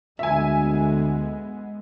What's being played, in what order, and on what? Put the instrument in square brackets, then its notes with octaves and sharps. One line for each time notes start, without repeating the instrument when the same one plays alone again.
[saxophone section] D2 [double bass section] G#3 B3 [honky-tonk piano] E5 G#5